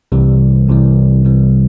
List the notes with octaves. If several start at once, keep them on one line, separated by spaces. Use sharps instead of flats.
C2 C3 E3 G3
C2 C3 E3 G3
C2 C3 E3 G3